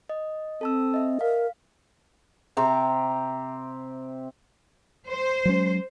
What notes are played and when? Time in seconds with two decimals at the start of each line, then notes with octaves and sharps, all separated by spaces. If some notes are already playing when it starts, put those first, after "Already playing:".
0.09 D#5
0.61 C4 A4 A5 E6
0.94 D#5 E5
1.21 A#4 F5
2.57 C3 C4 G4 A#5
5.08 C5
5.45 F#3 G#3 C#4